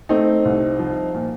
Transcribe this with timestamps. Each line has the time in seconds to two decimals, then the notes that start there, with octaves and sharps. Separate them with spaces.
0.09 A3 C4 D#4
0.45 C2
0.79 F3
1.15 A#2